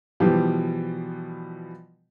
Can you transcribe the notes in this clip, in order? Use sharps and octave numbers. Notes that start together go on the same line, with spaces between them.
B2 E3 F3 G3 G4